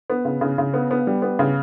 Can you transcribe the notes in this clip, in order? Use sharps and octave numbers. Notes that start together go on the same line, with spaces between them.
B3
C#3
C#3
C#3
B3
B3
G3
B3
C#3